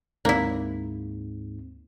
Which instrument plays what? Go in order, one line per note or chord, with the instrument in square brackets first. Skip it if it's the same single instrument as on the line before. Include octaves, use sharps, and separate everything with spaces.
[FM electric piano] D2 C4 [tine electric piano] G#2 [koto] A#3 E4